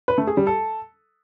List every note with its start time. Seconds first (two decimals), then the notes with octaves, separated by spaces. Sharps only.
0.08 B4
0.18 A3
0.27 G#4
0.37 G3
0.47 A4